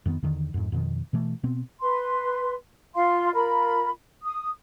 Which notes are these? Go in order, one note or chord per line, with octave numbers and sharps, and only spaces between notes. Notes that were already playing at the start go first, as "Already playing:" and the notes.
F2 D#3 A#3 B3
E2 D3 D#3
F2 G#2
F2 B2 D#3
B2 E3 A3
B2 B3 C4
B4 C6
F4 F5 C6
F4 A#4 B5
D#6